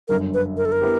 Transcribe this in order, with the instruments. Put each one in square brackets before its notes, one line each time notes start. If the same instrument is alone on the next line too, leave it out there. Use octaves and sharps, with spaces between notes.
[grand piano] G1 F#2 D3 [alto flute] A#4
[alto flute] B4
A#4
A4
A#4
[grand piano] B3 E4 G4